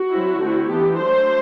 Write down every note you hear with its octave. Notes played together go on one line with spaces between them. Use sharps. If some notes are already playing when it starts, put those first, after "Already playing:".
Already playing: F#4
F#3 C4 E4
D3 A3 C4 E4
E3 B3 D4 G4
F#3 A3 D4 C5